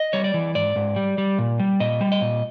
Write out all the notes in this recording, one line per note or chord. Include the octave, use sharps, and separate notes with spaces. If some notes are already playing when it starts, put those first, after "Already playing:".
Already playing: D#5
G3 C#5
D5
E3
G#2 D5
G#2
G3
G3
A#2
G3
A#2 D#5
G3
D#5
A#2